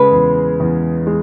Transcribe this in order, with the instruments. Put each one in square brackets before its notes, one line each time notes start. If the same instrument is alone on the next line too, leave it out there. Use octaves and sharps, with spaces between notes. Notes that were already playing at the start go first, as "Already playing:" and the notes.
Already playing: [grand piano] C#3 G#3 [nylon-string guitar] B4
[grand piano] E2
E2
G#3